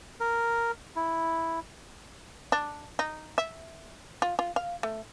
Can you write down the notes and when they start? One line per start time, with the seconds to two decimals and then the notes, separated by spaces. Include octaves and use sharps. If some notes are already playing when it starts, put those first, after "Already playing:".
0.20 A#4
0.96 E4
2.52 D4
2.99 D#4
3.38 E5
4.22 F4
4.39 F4
4.56 F5
4.83 A3